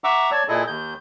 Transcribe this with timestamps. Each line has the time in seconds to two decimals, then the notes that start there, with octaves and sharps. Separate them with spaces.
0.04 E5 F#5 A#5 C#6 D6 E6
0.31 C#5 D5 A5 C#6
0.48 A#2 E4 G#4 A4 D#5
0.67 D#2 G6